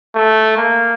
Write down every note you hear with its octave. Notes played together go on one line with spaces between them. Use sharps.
A3
A#3